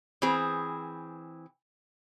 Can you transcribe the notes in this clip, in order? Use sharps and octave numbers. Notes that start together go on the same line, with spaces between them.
E3 C4 G#4